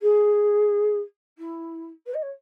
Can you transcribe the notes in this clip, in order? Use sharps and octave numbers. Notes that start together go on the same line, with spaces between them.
G#4
E4
B4
D#5
C#5